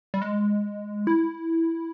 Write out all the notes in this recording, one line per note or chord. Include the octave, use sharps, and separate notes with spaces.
G3
G#3
E4